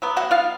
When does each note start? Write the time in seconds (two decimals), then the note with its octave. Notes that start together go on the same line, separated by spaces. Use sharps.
0.02 F#3 B3
0.17 F#4 F#5
0.31 F4 F5